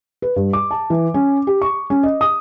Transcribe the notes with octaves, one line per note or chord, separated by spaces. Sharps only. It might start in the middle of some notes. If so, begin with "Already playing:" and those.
B4
G2
D6
A5
E3
C#4
G4
C#6
C#4
D#5
D#6